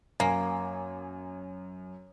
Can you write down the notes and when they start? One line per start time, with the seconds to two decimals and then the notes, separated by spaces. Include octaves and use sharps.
0.20 F#2 A#3 G#5